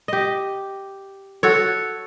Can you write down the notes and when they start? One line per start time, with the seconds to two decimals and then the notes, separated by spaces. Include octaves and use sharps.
0.08 G4 D#5
1.43 F#4 A4 C#5